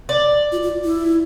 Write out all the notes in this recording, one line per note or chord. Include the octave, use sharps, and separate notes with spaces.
D5
F4
F4
E4